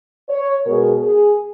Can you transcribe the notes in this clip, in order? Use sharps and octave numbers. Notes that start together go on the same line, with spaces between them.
C#5
B2 G#3 A#4
G#4